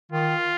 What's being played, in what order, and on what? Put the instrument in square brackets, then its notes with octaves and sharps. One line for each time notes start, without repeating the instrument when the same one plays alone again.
[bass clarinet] D#3 [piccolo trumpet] F4